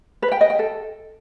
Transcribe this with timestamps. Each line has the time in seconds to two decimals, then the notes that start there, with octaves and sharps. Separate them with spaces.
0.22 B4
0.32 G5
0.41 D#5
0.50 G5
0.59 A4